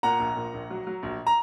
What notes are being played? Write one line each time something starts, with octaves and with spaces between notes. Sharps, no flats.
A#2 F#5 A#5
A#1
A#2
A#1
F#3
F#3
A#1
A#5